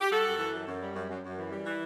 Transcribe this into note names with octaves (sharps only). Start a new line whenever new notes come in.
G4
G3 F#4 A4
F#2
E3
F#2
F#2
G3
F#2
F#2
F#2
E3
G3
E3